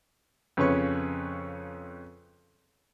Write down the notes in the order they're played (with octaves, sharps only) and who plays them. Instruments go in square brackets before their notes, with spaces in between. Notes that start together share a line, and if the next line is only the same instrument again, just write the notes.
[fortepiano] F2 C#3 C#4 B4 C#5 C#6